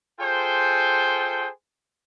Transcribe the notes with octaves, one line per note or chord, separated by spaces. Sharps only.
F4 G#4 A4 C5 G5